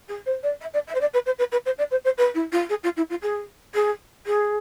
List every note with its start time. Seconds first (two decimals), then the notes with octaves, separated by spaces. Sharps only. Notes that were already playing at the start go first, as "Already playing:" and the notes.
0.08 G#4
0.26 C5
0.43 D5
0.61 E5
0.73 D5
0.87 E5
0.95 C5
1.00 D5
1.13 B4
1.26 C5
1.38 B4
1.52 B4
1.65 C5
1.78 D5
1.91 C5
2.04 C5
2.18 B4
2.34 E4
2.52 F4
2.69 G#4
2.83 F4
2.96 E4
3.09 F4
3.22 G#4
3.74 G#4
4.26 G#4